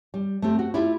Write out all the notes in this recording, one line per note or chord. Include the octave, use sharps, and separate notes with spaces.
G3
A3 C4 G4
F#4
E4 F4 G4 E5